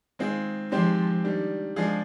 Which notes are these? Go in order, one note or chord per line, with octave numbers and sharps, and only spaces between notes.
D#3 G#3 C4 F4 G#4
D#3 F3 G#3 C4 G4 C5
D#3 G3 D4
F3 G#3 D4 F4 G#4